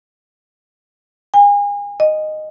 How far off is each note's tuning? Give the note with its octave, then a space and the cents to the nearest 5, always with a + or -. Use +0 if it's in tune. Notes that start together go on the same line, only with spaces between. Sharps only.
G#5 -35
D#5 -10